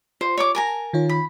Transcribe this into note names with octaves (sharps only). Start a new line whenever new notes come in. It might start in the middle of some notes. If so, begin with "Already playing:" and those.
F4 C5
C#5 C#6 D6
A#4 G#5 A#5
A5
D#3 F4 C#5
B5